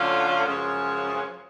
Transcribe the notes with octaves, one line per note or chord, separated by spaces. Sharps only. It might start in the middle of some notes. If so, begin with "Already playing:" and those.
Already playing: D3 F#3 A3 C#4 F4
F#2 C#3 F3 G#3 C#4